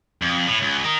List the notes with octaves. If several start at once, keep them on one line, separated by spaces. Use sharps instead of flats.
F2
A2
C#2
A#4 D#5